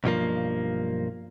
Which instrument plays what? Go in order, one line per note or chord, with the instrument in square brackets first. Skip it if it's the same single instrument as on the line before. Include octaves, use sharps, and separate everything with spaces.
[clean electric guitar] B1 G2 F3 A#3